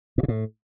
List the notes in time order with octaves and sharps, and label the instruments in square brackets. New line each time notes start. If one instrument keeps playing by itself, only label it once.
[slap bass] G#2
C3
A2